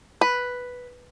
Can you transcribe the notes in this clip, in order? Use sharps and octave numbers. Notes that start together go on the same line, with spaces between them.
B4